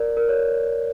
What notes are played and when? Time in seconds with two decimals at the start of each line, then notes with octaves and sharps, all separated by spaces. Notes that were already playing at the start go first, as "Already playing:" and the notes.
Already playing: A#4 D5
0.17 A#4
0.29 C#5